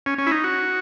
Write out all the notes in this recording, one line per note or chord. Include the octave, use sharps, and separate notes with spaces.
C#4
C#4
E4
D#4
F#4